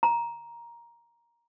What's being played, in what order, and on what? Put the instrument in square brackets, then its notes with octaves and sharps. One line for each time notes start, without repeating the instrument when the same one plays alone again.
[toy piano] A#5